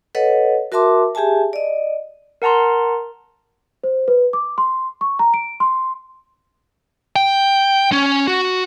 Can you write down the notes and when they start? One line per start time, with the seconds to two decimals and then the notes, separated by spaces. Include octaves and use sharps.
0.15 A4 B4 C#5 D#5 F#5
0.72 F#4 A#4 E5 A5 C6 D6
1.15 G4 G#4 E5 G#5 A5
1.53 D5 D#5
2.42 A#4 F#5 A5 A#5 C6
3.84 C5
4.08 B4
4.33 D6
4.58 C6
5.01 C#6
5.19 A#5
5.34 D7
5.60 C6
7.16 G5
7.92 C#4
8.27 F#4